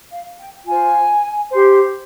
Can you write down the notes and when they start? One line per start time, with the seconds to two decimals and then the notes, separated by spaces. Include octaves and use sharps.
0.12 F5
0.39 G5
0.66 F4 C5 G#5
1.50 G4 C5